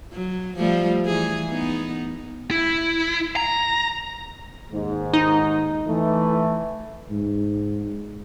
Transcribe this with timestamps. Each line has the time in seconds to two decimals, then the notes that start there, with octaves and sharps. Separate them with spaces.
0.13 F#3
0.57 F3 G3 A3
1.06 E3 G#4
1.50 B3 D#4
2.51 E4
3.36 A#5
4.71 D#2 G#2
5.13 D#4
5.87 E3 A3
7.11 G#2